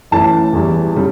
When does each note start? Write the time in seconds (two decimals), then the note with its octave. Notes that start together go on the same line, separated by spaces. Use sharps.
0.11 A1 A2 E3 A3 A5
0.53 E2 E3 G3
0.96 C#3 G3